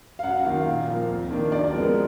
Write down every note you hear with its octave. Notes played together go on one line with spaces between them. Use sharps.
F5
F#2 F#5
D#3 F#3 A#3 F5
A#2
F3 A#3
F2
D#3 A#3 D4
F#2 D5
F3 G#3 B3 A#4